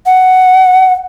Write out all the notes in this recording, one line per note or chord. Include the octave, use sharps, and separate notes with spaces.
F#5